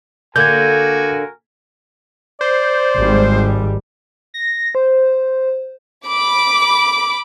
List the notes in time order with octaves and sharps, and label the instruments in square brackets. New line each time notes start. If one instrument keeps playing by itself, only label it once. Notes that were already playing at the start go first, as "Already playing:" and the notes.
[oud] D3 A#3 [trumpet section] F#4 A#4 G#5 [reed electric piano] G6 G#6
[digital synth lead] C5 [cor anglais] D5
[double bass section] G#1 G3
[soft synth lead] A#6
C5
[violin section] B5 D6